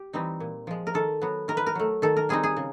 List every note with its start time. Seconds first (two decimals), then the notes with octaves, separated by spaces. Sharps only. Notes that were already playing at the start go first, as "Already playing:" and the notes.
Already playing: G4
0.13 E3 G3 C4 D#4
0.40 A#2
0.67 F3 G#3
0.87 A#4
0.94 D#3 A4
1.22 F#3 B3
1.48 D#3 A#4
1.57 B4
1.66 A#4
1.75 F#3 A3
2.02 D#3 A4
2.17 A#4
2.29 G3 C4 D#4 G#4
2.43 G#4
2.57 C#3